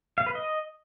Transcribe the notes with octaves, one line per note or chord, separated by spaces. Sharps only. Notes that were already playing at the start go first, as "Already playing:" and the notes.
F5
B4
D#5